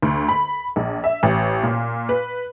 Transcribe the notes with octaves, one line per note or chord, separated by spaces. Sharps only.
D2
B5
A#1
E5
A1
A#2
B4